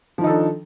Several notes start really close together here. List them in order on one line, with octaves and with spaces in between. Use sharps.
F3 D#3 D#4 A4 D4